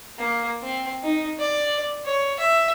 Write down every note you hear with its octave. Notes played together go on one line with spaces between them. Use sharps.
A#3
C4
D#4
D5
C#5
E5